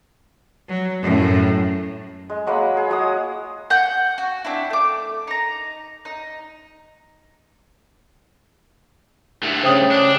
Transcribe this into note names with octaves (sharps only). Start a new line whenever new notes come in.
F#3
F#2 A2
G#3
F#3 G#3 A#3 B5
G#4
F#3 G#3 F#5 D#6
F#5 G5 G6
F#4
C4 D4 E4
A3 D6
D#4 A#5
D#4
G2 A3
C#3 C5 G5 D#6
D4